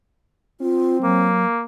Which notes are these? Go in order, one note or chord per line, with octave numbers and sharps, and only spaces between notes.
C4 F4
F#3 A#3